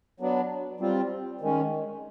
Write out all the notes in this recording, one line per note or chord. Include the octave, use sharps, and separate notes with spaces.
F#3 B3 D4
G3 C4 F4
D#3 G#3 C#4